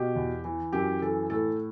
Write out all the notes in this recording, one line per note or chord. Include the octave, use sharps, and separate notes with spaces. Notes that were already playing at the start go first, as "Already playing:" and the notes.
Already playing: B2 G4
E2
E3
F#2 G4
E3 A4
A2 A4